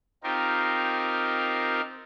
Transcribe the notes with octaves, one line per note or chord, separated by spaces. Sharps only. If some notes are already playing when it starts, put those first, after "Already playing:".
C4 D#4 F4 G4 A#4